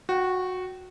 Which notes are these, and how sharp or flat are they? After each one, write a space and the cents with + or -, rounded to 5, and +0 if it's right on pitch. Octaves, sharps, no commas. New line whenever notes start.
F#4 -15 G5 -40